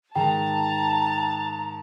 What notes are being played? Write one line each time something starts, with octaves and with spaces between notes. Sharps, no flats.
G#2 D#3 G5 A5 A#5